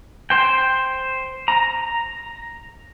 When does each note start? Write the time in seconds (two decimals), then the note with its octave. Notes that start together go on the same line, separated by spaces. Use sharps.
0.30 C5 G5
1.48 A#5